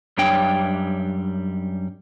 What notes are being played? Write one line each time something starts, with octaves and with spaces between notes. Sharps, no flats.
F#2 G3 D4 C#5 G5